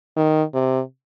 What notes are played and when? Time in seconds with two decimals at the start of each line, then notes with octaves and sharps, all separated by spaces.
0.16 D#3
0.54 C3